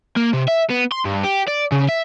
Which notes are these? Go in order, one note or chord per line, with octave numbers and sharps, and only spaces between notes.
A#3
C3
E5
B3
C6
G2
G4
D5
C#3
E5